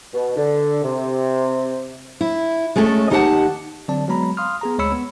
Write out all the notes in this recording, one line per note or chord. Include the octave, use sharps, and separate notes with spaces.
B2
D3
C3
E4
G#3 A3 C#4 G#4 A4
D#2 D#4 G4 E5 F#5 A5
D3 F#3 C4 D5 A5
F#3 G#3 B3 A#5 B5
F5 C6 D#6 F6
B3 G#4 A#5
D2 G#3 C#5 B5 E6 C#7
B3